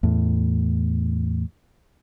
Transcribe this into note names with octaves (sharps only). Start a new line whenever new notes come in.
E2 A2